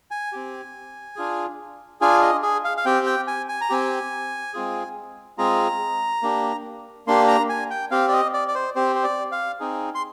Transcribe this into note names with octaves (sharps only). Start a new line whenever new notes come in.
G#5
C4 G4
D4 F4 G#4
D4 F4 G#4 G#5
D#5
G#4
F5
F5
C4 G4 G5
G5
G#5
G#5
A#5
C4 G4 G#5
G#3 C4 F4 G#4
G#3 C4 F4 G#4 A#5
A#3 D4 G4
A#3 D4 G4 C6
A#5
G#5
G5
C4 G4 F5
D5
D#5
D5
D5
C5
C4 G4 C5
C5
D5
F5
C4 D#4 G#4
C6